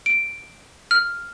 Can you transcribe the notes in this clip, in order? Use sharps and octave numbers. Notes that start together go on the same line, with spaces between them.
D7
F6